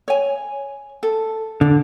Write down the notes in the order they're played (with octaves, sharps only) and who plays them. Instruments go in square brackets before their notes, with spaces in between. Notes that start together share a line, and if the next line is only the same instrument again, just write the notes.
[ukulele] C#5 G#5
A4
[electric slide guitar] D3 [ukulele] D4